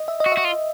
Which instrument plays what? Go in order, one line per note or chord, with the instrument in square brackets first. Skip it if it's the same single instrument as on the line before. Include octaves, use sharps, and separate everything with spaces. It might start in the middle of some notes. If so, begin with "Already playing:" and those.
Already playing: [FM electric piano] D#5
E5
D#5
[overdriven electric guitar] F#4
[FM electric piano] E5
[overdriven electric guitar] F#4
F4